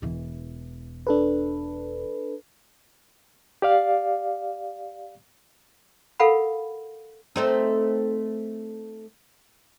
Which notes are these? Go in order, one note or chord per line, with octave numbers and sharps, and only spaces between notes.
E1 E3
D4 A4 B4
G4 D5 F5
A4 A#4 F5 F#5 B5
A3 C4 D#4